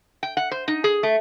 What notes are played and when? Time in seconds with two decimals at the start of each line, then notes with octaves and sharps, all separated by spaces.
0.23 G5
0.37 F#5
0.51 C5
0.68 D#4
0.84 G#4
1.03 A3